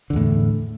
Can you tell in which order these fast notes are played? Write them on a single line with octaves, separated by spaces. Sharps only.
D3 E2 A2